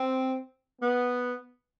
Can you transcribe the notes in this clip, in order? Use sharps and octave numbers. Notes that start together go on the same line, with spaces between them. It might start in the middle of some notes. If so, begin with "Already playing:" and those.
Already playing: C4
B3